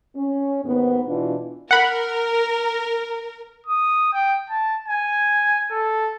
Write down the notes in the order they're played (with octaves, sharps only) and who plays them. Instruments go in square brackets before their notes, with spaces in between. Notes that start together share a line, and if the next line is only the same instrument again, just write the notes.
[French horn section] C#4
D#2 G#2 B3
B2 E3 D4 F4
[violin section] A#4 [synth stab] F#5 B5
[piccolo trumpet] D#6
G5
A5
G#5
A4